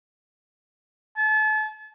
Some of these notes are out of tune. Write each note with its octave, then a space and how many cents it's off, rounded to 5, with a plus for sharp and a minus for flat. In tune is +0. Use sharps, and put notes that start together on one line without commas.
A5 -35